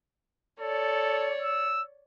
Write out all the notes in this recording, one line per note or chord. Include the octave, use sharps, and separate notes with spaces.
A4 C#5 D5
E6